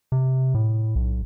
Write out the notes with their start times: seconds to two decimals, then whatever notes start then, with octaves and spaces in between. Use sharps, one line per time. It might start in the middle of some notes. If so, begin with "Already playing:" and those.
0.12 C3
0.54 A2
0.95 B1